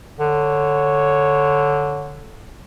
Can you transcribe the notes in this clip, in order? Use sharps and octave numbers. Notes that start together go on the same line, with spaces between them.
D3 C#5